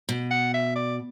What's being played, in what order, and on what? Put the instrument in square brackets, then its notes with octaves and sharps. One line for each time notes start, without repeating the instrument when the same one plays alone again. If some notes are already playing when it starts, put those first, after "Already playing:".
[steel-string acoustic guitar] B2
[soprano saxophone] F#5
E5
D5